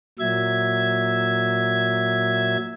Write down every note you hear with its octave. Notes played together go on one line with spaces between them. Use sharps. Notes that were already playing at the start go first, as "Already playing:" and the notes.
A#2 F#3 E5 G#6